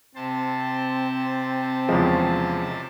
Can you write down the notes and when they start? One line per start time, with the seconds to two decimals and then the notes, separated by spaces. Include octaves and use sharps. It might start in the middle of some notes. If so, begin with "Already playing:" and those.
0.16 C3 C4 C5 A5
1.89 E2 C#3 F3 G#3